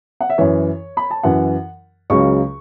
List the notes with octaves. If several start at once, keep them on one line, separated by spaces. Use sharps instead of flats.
F#5
E5
F#2 E3 C#5
B5
A5
F#2 E3 F#5
C#2 C#3 F#3 C#6